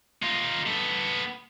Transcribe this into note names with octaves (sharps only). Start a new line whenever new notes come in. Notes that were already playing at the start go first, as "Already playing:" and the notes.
D#4 F4
B3 A4